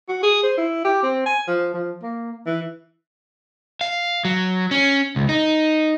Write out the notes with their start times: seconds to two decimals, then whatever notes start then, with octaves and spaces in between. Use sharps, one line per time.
0.09 F#4
0.23 G#4
0.43 C5
0.58 E4
0.85 G4
1.03 C4
1.26 G#5
1.48 F3
1.74 F3
2.03 A#3
2.47 E3
3.81 F5
4.25 F#3
4.71 C#4
5.16 C#2
5.29 D#4